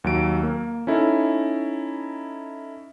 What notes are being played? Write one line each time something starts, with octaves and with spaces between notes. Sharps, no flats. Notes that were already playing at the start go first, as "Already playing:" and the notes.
D#2 F#3 D7
A#3
C#4 D#4 E4 A4